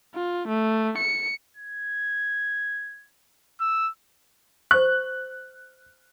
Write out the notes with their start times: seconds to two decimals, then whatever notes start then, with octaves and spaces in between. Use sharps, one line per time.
0.15 F4
0.48 A3
0.98 C#7
1.57 G#6
3.61 E6
4.71 C5 C#6 F#6